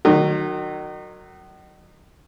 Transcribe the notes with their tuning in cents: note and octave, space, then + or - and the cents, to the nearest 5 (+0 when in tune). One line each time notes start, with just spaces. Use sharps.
D#3 -35 F#3 +0